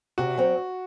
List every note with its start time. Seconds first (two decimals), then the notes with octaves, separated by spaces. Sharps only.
0.18 C3 F#4
0.37 F#3 C4